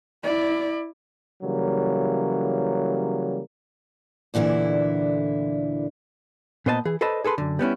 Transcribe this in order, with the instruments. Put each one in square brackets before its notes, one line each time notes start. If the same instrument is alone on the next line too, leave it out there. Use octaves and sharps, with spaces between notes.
[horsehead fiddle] E4 D5
[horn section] C#3 E3 F#3 G3 A#3
[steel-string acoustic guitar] D2 A#2 D3 E3 E4
[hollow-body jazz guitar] A#2 B3 C5 D#5 A5
E3 G#4
A4 B4 C5 D5 D#5 A5
G#4 A4 B4 C6
F#2 D3
G3 B3 C#4 E4